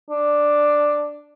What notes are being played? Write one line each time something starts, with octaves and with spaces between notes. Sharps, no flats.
D4